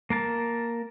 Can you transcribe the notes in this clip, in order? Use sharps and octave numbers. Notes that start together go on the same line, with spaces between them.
A#3 A#4 A5